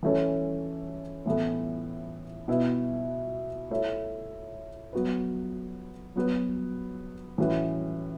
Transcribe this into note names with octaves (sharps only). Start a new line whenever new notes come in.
E3 A3 C#4 A4 C#5
A2 E3 B3 A4
B2 B3 E4 B4
A3 E4 C#5 E5
F#3 B3 F#4 B4
F#3 B3 F#4 B4
A2 E3 C#4 F#4 B4